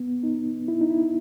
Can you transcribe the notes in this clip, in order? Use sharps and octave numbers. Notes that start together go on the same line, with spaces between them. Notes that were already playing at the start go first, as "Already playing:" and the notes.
Already playing: B3
D#4
E4
D#4
E4